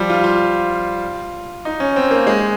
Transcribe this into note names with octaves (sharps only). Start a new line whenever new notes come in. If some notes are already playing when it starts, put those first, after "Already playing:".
Already playing: F3 G3
F4
F4
D#4
C#4
C4
A#3
G#3